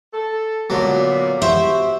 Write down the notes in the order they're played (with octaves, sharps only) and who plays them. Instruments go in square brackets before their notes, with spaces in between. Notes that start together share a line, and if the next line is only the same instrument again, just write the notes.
[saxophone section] A4
[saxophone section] A#2 B3 [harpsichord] D3 F#3
[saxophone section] B3 F#4 G4 [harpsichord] C5 [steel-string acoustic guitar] E5